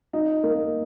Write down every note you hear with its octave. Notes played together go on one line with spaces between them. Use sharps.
D#4
A#3